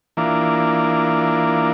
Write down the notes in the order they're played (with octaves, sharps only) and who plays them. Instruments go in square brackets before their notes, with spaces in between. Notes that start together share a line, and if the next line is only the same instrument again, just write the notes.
[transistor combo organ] E3 A#3 D4 F4